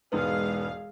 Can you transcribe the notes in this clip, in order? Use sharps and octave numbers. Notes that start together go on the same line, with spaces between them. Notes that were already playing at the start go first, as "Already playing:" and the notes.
E1 G#2 B3 G#4 F5